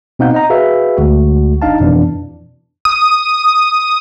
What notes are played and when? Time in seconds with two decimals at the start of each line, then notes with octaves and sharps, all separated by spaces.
0.19 B2 C4 D#4 F5 F#5 G6
0.34 D#5 A#5
0.50 F#4 G#4 B4 E5 F5
0.97 D2 G#3 F#4
1.62 G1 D4 D#4 F5 A5
1.80 F2 B2 E3 D4
2.85 D#6